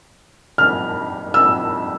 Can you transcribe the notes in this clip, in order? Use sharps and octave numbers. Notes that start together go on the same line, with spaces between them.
F6
E6